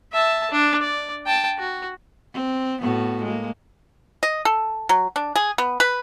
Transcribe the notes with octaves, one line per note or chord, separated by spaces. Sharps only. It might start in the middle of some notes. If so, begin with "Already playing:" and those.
E5 A5
D4
D5
G5 A5
F#4
C4
A2 B3 F#4
G#3 A#3
D#5
A4
F#3
D4
G#4
B3
B4